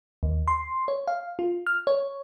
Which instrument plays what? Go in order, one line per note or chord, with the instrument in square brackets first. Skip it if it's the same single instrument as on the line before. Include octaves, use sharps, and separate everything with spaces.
[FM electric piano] D#2
C6
C#5
F5
F4
F6
C#5